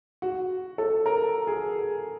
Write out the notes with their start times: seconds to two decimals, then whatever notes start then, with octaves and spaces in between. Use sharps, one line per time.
0.22 F#4
0.78 A4
1.06 A#4
1.47 G#4